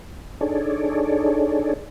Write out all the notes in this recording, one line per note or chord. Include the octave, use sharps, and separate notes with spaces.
D4 D#4 G#4 A4 C#5 D5